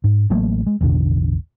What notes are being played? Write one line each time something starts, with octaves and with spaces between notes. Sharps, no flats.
G#2
A1 F#3 A3 A#3
G#3
A1 E2 B2 D3